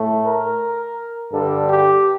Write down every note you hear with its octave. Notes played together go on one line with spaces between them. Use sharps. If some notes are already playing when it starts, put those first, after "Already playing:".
Already playing: A2 A3
A#4
G2 D3 G3 A4
G4